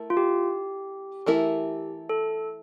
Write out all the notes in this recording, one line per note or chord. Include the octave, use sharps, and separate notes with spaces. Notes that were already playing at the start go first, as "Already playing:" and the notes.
Already playing: A3 E4 A#4
F4
G4
E3 A3 E4 A#4
A4